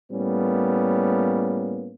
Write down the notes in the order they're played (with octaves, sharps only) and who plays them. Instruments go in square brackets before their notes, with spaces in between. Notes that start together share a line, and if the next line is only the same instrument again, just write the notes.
[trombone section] A2 G3 A#3 B3 C#4